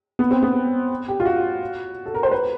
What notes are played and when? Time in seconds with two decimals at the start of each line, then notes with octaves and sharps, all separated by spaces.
0.19 B3
0.31 C4
0.43 B3
1.08 G4
1.20 F4
1.25 F#4
2.06 A4
2.15 A#4
2.23 C5
2.31 B4